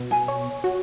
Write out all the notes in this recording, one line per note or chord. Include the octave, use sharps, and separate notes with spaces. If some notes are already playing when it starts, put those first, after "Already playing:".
Already playing: B2
G#5
C#5
F#4